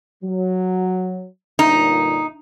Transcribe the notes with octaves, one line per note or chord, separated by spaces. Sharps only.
F#3
G1 A#2 D#4